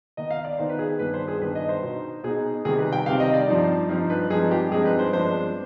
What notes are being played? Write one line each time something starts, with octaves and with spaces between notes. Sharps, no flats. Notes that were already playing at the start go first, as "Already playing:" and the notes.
D#3 B3 D#4 D#5
F5
D5
D#3 B3 D#4 C5
B4
G#4
G2 D#3 B3 B4
C5
G#4
G2 D#3 B3 B4
D#5
C5
B2 B3 D#4
B2 B3 D#4 G#4
C3 D#3 G3 C4 G#4
B4
G5
C3 D#3 G3 C4 F5
D#5
D5
G2 F3 C4 D#4
G2 F3 C4 D#4
B4
G2 F3 G#3 C4 D#4 G#4
G4
G2 F3 G#3 C4 D#4 G#4
B4
C5
G2 F3 G#3 B3 D4 C5